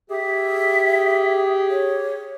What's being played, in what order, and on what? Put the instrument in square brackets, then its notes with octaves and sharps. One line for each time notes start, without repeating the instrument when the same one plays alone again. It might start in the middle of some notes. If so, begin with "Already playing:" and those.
[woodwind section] G4 G#4 [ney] E5
[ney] C#5